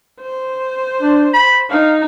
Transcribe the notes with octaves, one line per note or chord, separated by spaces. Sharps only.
C5
D4
B5
D#4 F5